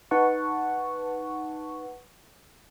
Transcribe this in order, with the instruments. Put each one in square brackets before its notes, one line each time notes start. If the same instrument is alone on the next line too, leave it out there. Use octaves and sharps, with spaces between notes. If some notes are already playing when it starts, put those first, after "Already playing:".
[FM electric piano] D#4 B4 F#5 A5 C#6